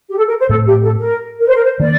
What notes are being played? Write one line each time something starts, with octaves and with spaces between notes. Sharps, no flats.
G4
A4
A#4
C5
A2 A3 C4 A4
G4
A4
A#4
A#4
C5
A#4
C5
D#3 A#3 D4 D5